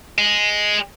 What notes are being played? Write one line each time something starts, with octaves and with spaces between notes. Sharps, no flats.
G#3